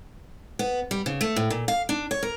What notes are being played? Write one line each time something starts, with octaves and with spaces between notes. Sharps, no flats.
B3
G3
C#3
A3
A2
A#2
F5
D4
C#5
A#4